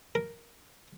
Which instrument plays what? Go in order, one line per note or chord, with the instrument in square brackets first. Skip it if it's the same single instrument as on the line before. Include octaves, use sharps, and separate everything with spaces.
[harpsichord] A#4